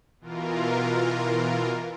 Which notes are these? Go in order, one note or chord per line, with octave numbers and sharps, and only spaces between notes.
B2 E3 F4 A#4